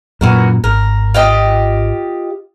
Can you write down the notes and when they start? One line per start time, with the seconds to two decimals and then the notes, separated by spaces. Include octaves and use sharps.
0.21 F#2 A#2 E3 F#4 A#4
0.64 G#1 A#4
1.14 F4 G4 D#5